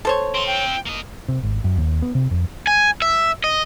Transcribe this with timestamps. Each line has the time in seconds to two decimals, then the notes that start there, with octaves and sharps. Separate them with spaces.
0.05 A4 C5 C#5
0.35 C4 F4 C6
0.47 G5
0.86 A#3 D#5
1.28 C3
1.43 G#1
1.64 F#2
1.77 D#2
2.02 B3
2.15 C3
2.31 F2
2.67 G#5
3.02 E5
3.44 D#5